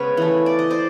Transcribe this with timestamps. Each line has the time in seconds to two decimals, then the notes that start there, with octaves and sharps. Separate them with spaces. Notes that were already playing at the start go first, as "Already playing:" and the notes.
Already playing: C#3 G#3 B3 B4 C#5
0.17 E3 A3
0.46 D5
0.59 D#5
0.70 C5 D5